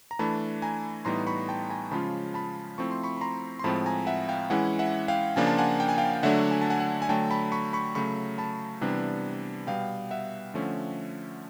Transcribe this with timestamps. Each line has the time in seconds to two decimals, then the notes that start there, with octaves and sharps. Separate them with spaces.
0.11 A#5
0.19 E3 A3 D4 A5 B5
0.62 G#5 A#5
1.05 A2 E3 G3 B3 D#4 A#5 C6
1.27 B5 C#6
1.49 G5 A5
1.70 G#5 A#5
1.91 C#3 F3 G#3 C#4 F4 A5 B5
2.34 A5 B5
2.78 F3 A3 C4 E4 C#6
2.91 C6
3.04 B5 C#6
3.17 B5
3.21 A#5 C6
3.59 C6
3.64 A2 F3 G#3 C4 A5 B5
3.86 G#5 A#5
4.07 E5 F#5
4.29 F5 G5
4.50 E3 G#3 C#4 E4 F#5 G#5
4.79 E5 F#5
5.08 F5 G5
5.36 C#3 F3 A#3 D4 F4 G#5
5.47 A5
5.58 F#5 G#5
5.80 G5
5.89 G#5
5.98 F5 G5
6.13 G5
6.23 D3 F#3 A3 D4 E5 F#5
6.51 G#5
6.62 A5
6.70 F#5 G#5
6.80 F#5 G#5
7.02 G#5
7.09 D3 F#3 A3 G5 A5
7.31 A5 B5
7.52 B5 C#6
7.73 B5 C#6
7.95 C#3 F#3 A3 B5 C#6
8.38 A5 B5
8.81 C3 E3 G3 B3 D4
9.67 B2 G3 B3 F5 G5
10.11 E5 F#5
10.54 D3 F3 A3 C#4